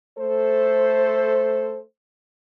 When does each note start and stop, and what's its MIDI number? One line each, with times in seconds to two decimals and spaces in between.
0.18 1.82 57
0.18 1.82 69
0.18 1.82 72